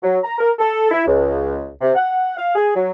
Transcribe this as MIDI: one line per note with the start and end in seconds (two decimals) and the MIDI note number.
0.03 0.17 54
0.24 0.37 82
0.39 0.51 70
0.59 0.89 69
0.91 1.04 64
1.07 1.67 37
1.81 1.92 48
1.95 2.35 78
2.37 2.52 77
2.55 2.69 68
2.75 2.90 54